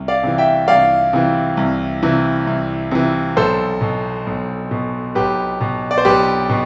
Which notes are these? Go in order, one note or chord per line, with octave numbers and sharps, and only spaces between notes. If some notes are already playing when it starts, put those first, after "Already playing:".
Already playing: C2
D5 F5
C3 E3
E5 G5
C2 D5 F5
C3 E3
C2
C3 E3
C2
C3 E3
B1 A4 C5
B2
B1
B2
B1 G4 B4
B2
D5
C5
B1 G4 B4
B2